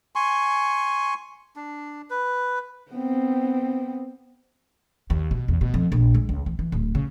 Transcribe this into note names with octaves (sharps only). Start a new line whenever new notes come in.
G#5 C6 C#6
D4
B4
B3 C4
D#2
B2
E2
B2
F2
A#1
G#3
C#2
E3
E3
D1
C#3